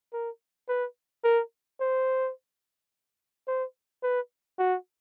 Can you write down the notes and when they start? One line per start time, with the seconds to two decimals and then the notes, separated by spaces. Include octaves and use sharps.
0.13 A#4
0.69 B4
1.24 A#4
1.80 C5
3.47 C5
4.03 B4
4.59 F#4